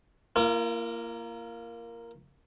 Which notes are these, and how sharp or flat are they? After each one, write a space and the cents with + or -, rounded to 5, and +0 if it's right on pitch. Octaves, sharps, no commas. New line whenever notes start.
A#3 +0 F4 -45